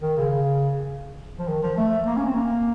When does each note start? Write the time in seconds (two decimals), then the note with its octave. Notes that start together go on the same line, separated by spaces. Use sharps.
0.02 D#3
0.17 C#3
1.39 F3
1.48 D#3
1.63 F3
1.77 A3
2.06 A#3
2.17 C#4
2.26 C4
2.35 A#3